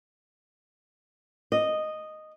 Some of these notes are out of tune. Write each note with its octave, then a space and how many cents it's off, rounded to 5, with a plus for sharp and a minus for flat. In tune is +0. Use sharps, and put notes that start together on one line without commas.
D#5 -5